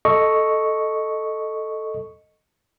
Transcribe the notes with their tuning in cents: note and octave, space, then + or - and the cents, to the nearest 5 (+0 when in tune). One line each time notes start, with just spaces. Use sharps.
A4 +0 D#5 +0 C#6 +0